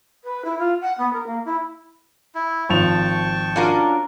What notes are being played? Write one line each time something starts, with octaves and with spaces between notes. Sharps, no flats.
B4
E4
F4
F#5
B3
A#4
A#3
E4
E4
G#1 F3 G5 A5 C#6 F7
C#4 D4 F4 F#4 A#4